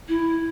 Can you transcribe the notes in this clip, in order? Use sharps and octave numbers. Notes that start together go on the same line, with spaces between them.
E4